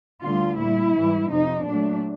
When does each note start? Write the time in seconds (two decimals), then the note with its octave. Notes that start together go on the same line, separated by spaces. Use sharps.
0.24 D2 D3 G3 F4
0.60 A#2 G3 E4
0.95 G#2 E3 G3
1.31 F2 C3 F3 D#4
1.67 A#2 F#3 A3 D4